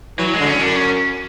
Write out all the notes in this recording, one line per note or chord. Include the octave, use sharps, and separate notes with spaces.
E3 F#3
G#3
D3
C#4
F#2 D4
C#4